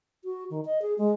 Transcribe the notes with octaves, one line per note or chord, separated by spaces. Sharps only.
F#4
D#3
D#5
G#4
G#3